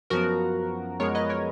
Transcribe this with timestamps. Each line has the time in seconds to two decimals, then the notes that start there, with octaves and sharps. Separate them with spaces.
0.10 F#2 F3 B3 F#4 A#4
1.00 F#2 F3 G#3 B3 A#4 C#5
1.15 B4 D#5
1.29 A#4 C#5